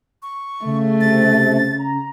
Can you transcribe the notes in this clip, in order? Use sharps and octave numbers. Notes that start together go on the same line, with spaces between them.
C#6
C#3 A3
C3 A6
A#5